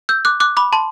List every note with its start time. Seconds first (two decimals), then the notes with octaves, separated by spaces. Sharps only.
0.09 E6 G6
0.25 D6 F#6
0.40 D6 F#6
0.57 B5 D6
0.73 A5 C6